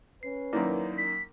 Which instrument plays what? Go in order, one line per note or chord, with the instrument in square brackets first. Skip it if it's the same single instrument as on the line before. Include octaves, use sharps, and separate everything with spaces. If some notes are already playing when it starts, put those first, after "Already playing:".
[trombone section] C#4 B4 [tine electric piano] C7
[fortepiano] F#2 D#3 A#3 [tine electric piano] E4 D5
[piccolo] B6